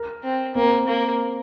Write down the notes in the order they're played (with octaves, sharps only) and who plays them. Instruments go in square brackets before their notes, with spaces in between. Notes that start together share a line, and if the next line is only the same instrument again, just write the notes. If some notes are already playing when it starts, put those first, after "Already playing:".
Already playing: [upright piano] A#4
[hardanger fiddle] C4
[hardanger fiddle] A#3 [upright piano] C4
[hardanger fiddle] A#3